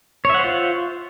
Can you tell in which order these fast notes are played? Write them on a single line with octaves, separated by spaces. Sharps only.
C#5 E5 F#5 C5 F4